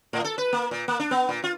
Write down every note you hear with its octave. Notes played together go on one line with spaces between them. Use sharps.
A2
A4
B4
A#3
A#2
A#3
D4
B3
A#2
F4